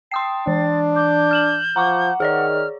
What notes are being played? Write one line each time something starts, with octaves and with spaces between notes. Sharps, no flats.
G5 A5 C6 D#6 C7
E3 D4 A6
D6 G6
F6 E7 F#7
F3 F#5 A#5 C#6 D6
D#3 G#4 C#5 D5 F6